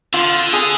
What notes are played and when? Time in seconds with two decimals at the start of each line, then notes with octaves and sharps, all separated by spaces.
0.13 D3 F4
0.53 G#4